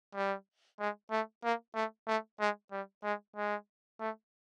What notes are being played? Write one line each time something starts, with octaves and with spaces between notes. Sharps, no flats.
G3
G#3
A3
A#3
A3
A3
G#3
G3
G#3
G#3
A3